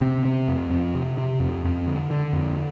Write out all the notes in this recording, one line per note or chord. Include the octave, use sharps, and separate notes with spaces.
C3 C4
C3
F2
F2
C3
C3
F2
F2
D3
D3
F2